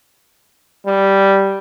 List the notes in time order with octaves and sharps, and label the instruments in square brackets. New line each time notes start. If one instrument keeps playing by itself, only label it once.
[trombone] G3